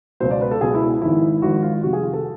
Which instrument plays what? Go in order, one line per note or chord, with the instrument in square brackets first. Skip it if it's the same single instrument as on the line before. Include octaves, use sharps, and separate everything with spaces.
[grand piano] C#2 B2 F#3 C5
D5
B4
A4
C#2 B2 F#3 G#4
E4
G#1 G#2 F3 E4
G#1 G#2 F3 F#4
F4
F2 C3 D#3 G3 F#4
G#4
F4
A4